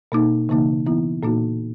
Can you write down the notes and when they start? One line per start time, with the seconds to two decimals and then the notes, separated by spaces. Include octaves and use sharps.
0.12 B2 A#3 D#4
0.49 C#3 E3 A#3 D#4
0.86 E3 B3 E4
1.23 A#2 A#3 D#4 F#4